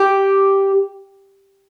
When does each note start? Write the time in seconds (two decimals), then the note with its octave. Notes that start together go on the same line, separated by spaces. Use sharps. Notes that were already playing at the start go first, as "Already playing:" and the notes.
Already playing: G4